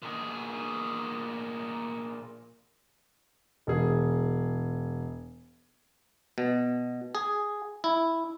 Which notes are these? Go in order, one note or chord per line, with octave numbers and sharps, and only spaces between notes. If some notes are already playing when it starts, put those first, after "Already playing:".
A#2 G#4
E1 G#4
B2
G#4
E4